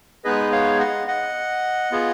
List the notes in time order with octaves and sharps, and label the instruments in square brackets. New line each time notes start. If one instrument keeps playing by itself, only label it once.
[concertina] G#3 B3 D#4 G#4 B4 D#5
C#5 F5
D#5 F#5
D#5 F#5
B3 F4 G#4